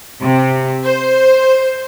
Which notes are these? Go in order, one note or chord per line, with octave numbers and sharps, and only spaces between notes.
C3
C5